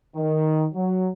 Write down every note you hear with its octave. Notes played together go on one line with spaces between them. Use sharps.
D#3
F#3